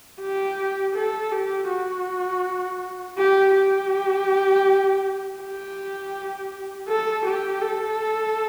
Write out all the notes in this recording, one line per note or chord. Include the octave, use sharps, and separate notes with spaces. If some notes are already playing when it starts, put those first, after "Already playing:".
G4
A4
G4
F#4
G4
G4
G4
A4
G4
A4